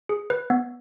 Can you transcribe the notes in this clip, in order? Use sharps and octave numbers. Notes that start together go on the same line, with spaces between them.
G#4
B4
B3